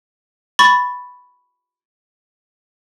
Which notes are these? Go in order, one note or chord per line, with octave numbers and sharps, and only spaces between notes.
B5 C#6 A6